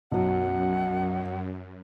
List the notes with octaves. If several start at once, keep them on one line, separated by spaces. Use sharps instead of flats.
B1 F#2 F#3 F#5